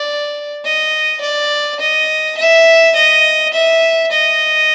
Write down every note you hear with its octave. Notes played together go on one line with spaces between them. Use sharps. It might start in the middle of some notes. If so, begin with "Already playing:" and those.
Already playing: D5
D#5
D5
D#5
E5
D#5
E5
D#5